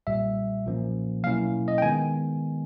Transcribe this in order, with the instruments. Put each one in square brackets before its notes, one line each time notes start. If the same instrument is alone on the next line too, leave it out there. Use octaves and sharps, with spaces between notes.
[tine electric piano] B1 A#2 G3 E5
B1 A#2 F3 A#3 C#4
B2 F#3 A#3 C#4 E4 F5
D#5
G5
D#3 G#3 B3 G#5